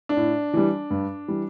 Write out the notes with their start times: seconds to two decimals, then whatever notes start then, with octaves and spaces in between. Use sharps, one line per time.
0.09 D4
0.17 A2
0.53 E3 G3
0.90 G2
1.28 E3 G3